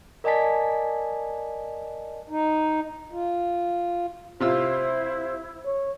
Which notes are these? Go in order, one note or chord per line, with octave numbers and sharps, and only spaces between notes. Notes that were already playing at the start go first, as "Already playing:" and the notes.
A#4 D5 D#5 G#5 A5 B6
D#4
F4
C3 E4 F4 C5 E6
C#5